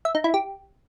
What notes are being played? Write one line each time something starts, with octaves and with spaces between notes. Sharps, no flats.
E5
D#4
E4
G4